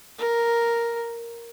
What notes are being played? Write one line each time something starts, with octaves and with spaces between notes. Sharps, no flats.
A#4